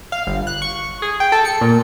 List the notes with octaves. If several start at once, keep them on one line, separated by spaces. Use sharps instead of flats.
F5
G1
F#6
C#6
G#4
G5
A4
C#7
A#2